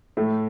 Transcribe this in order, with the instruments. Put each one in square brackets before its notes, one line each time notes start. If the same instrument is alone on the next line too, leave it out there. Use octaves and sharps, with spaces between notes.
[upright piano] A2 A3